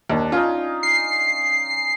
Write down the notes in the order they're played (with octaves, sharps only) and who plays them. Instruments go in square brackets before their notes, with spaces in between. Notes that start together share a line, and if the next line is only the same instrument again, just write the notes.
[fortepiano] D#2 [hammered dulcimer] D4
[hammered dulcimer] C#4 D#4 [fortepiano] F4
[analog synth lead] C7